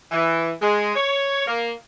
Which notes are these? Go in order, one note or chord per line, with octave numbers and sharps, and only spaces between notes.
E3
G#3
C#5
A#3